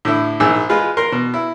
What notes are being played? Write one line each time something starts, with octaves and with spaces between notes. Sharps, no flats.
A2 D3 E4
A#1 G#2 G#4 E6
G#3 F4 B4
A#4 C6
B2
E4